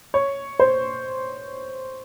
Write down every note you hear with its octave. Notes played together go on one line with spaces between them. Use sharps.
C#5
C5